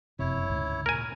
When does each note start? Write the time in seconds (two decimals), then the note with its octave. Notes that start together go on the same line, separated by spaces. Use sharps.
0.19 F#1 F2 C3 E4 C#5
0.50 D2 G#2 C#3
0.86 A#2 A#4 G#5